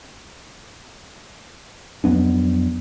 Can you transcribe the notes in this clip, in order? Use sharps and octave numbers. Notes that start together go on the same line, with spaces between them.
F2 F#3 B3 D4